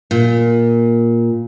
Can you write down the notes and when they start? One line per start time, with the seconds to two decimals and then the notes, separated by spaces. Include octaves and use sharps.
0.11 A#2